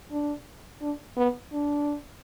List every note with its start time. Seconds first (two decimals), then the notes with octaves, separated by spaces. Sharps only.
0.12 D4
0.82 D4
1.17 B3
1.53 D4